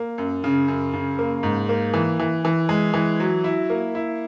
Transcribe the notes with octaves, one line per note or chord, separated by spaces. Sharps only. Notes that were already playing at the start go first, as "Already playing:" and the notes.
Already playing: A#3
F#2
C#3
F#2
C#3
A#3
G#2
A#3
E3
E3
E3
G#3
E3
F#3
E4
A#3
E4